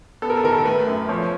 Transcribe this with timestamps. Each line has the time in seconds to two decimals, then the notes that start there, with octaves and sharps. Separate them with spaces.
0.22 B3 A4
0.30 A#4
0.37 A4
0.44 D#3 A#4
0.52 A4
0.65 A3 B4
0.87 F#2
1.09 F3 C#5